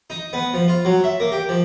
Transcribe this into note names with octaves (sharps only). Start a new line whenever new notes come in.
D#4
B3
F3
F4
F#3
E5
A#3
G4
F3